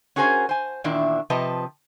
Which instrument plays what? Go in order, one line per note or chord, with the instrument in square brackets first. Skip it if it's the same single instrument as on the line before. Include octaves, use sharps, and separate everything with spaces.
[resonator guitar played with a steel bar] C#4 F#4 G#4 A#4 C5 G#5
C5 G#5
E2 A#2 D#3 D4 E4
C3 F3 B4 D#5 A5